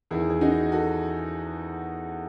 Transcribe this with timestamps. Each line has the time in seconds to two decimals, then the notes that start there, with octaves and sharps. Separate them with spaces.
0.11 E2 D#3 E4 G#4
0.29 G#4
0.41 D#4 F#4
0.72 F#4 A4